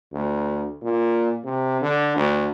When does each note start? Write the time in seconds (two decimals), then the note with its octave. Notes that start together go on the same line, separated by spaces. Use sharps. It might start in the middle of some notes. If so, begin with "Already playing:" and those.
0.13 D2
0.82 A#2
1.45 C3
1.82 D3
2.16 D2